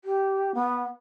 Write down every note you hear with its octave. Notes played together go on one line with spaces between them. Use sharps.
G4
B3